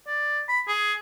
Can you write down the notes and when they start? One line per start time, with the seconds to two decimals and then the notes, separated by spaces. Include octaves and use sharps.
0.07 D5
0.49 B5
0.68 G#4